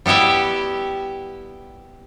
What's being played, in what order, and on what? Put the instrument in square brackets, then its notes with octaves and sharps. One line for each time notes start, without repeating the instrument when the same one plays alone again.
[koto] G3 B3 E4 G4 E5